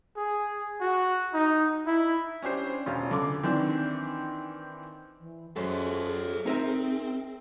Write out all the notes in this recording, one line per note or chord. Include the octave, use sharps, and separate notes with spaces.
G#4
F#4
D#4
E4
C#4 D4 G4 C5
E1 C#4 F4
D3 D6
D#3 E3 C4 D4
E3
F#2 G#4 A4 C5
C4 D#4 A#4 E5